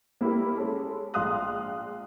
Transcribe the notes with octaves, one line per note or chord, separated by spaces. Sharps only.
A#3 E4 G4 A#4
G#3 C#4 A4
A#1 G#3 F5 C6 D#6 F#6